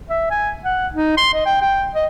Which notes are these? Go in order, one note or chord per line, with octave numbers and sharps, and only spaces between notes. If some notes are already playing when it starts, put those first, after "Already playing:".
E5
G#5
F#5
D#4
C6
D#5
G5
G5
D#5